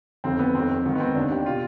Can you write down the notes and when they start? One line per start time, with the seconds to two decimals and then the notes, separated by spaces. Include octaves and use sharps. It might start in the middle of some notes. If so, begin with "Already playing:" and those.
0.24 G1 F2 D#3 C4
0.39 B3
0.54 G1 F2 D#3 C4
0.86 G#1 G#2 D#3
0.95 B3
1.00 C4
1.15 D#2 D#3 D4
1.31 G4
1.46 B2 F4